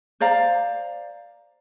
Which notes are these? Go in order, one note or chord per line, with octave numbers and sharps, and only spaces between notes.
C5 D5 F5 A#5